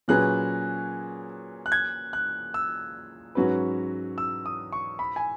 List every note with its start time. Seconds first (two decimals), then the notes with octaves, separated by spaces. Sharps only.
0.08 A#2 F#3 C#4 G#4 B4 F#6
1.66 F#6
1.72 G#6
2.13 F#6
2.54 E6
3.35 G#2 F#3 C#4 F#4 B4
4.18 E6
4.46 D#6
4.72 C#6
4.99 B5
5.16 G#5